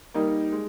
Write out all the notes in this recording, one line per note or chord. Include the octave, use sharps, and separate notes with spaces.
G3 A#3 D#4
G#3